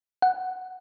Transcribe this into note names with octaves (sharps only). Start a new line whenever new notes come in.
F#5